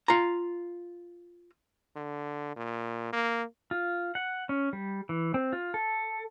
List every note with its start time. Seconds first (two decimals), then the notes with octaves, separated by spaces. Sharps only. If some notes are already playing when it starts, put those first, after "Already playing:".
0.08 F4 A#5
1.96 D3
2.56 A#2
3.13 A#3
3.71 F4
4.15 F#5
4.49 C#4
4.73 G3
5.09 E3
5.34 C4
5.53 F4
5.74 A4